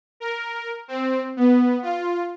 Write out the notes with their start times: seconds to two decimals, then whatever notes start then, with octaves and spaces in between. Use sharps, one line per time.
0.20 A#4
0.88 C4
1.37 B3
1.82 F4